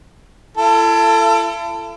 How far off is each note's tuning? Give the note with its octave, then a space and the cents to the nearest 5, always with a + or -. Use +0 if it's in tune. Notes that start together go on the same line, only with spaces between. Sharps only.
E4 +45 A4 +15